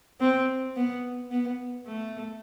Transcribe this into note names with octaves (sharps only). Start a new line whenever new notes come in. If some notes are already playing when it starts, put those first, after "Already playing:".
C4
B3
B3
A3